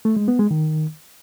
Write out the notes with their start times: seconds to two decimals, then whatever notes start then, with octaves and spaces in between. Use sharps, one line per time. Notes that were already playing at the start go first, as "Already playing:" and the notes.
0.05 A3
0.16 G#3
0.28 B3
0.39 G#3
0.51 D#3